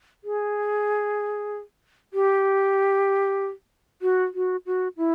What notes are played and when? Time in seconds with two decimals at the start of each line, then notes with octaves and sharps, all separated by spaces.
0.24 G#4
2.13 G4
4.02 F#4
4.34 F#4
4.66 F#4
4.97 E4